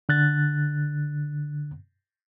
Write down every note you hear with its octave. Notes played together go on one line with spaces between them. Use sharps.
D3 F#6 A6